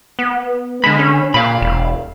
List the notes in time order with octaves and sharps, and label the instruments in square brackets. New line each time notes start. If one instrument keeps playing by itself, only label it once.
[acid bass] B3
[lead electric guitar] D3 B5 [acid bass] G#3
[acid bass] C#4
[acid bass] A#2 [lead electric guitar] F5 B5
[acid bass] E1